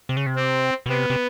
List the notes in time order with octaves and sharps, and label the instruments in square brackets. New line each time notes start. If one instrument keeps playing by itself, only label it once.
[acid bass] C3
C#3
C3
[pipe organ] C4
[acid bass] B2
[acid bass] C3 [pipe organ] B3
[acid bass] C3